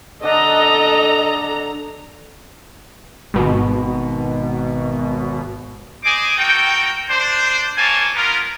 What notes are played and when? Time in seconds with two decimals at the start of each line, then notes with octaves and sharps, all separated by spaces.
0.23 D3 D4 A4 D#5 A#5
3.34 G#1 B2
6.04 G#4 C5 D#5 G#5 D6
6.37 F#4 A4 A#4 G5
7.09 D4 C5
7.77 A#3 C4 F4 C#5 G#5 A5
8.16 B3 F4 A#4